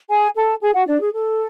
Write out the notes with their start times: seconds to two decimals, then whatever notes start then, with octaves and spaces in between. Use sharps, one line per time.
0.09 G#4 G#5
0.36 A4 A5
0.61 G#4 G#5
0.74 F#4 F#5
0.87 D4 D5
1.00 G#4
1.13 A4